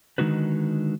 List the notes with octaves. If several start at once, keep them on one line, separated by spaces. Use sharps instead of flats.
D3 D#3 G#3 D#4 F#4 B4